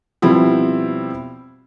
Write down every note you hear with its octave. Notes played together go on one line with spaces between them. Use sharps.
B2 F3 G3 C4 E4